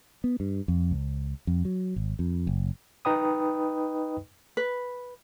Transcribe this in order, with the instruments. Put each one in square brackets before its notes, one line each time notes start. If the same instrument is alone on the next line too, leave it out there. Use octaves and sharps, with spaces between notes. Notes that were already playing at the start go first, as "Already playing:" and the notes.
[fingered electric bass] B3
G2
F2
C#2
F2
F#3
G#1
F2
F#1
[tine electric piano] D#4 B4 D#5 G5 B5 D#6
[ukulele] B4